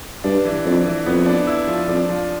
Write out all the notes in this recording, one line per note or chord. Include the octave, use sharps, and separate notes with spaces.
G2 D4
E3
F2 D4
E3
F2 B3
D4
E4
F3
F2 D4
F3